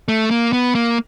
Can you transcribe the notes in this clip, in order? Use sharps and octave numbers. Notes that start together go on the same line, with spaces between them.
A3
A#3
B3
A#3